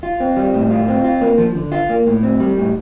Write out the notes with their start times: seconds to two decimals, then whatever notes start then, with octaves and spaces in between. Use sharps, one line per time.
0.03 F4
0.20 C4
0.36 G3
0.54 A2
0.70 F4
0.88 C4
1.04 F4
1.21 A#3
1.38 F3
1.55 D3
1.72 F4
1.89 A#3
2.07 A2
2.23 C4
2.40 G3
2.58 A2